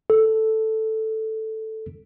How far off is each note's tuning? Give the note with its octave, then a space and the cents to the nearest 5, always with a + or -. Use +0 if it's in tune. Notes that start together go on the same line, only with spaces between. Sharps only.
A4 +0